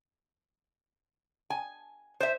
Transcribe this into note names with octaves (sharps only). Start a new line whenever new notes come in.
G#5
C5 E5